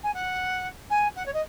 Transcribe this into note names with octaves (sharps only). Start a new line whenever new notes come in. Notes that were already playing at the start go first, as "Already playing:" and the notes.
G#5
F#5
G#5
F#5
C#5
D#5